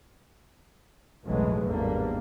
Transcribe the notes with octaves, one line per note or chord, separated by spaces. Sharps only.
F1 B1 A2 E3 F#3 G#3
G#1 E2 D3 G3 A#3